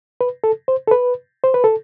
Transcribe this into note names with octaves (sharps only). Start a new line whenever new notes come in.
B4
A4
C5
A4
B4
C5
B4
A4